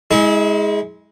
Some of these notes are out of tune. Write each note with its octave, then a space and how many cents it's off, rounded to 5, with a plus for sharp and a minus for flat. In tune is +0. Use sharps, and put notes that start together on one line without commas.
G#3 +0 E4 -35